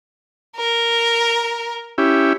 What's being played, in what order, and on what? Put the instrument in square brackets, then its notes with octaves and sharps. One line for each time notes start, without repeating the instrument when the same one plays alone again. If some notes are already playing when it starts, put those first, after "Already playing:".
[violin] A#4
[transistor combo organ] C#4 E4 G4